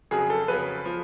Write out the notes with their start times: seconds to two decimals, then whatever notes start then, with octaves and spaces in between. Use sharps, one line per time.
0.11 F2 C#3 F#3 G#4
0.30 A4
0.48 F2 C#3 F#3 B4
0.85 F3